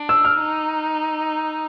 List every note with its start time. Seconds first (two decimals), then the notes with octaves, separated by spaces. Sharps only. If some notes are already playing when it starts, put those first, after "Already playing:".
Already playing: D4
0.09 E6
0.25 F6
0.40 D#4